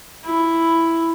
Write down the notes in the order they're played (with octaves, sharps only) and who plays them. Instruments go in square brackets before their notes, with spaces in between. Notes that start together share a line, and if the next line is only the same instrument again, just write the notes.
[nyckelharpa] E4